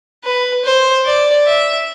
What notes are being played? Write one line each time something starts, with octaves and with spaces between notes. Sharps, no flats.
B4
C5
D5
E5